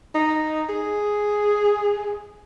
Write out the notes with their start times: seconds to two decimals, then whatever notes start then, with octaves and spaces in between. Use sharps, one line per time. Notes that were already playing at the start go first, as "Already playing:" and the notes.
0.15 D#4
0.69 G#4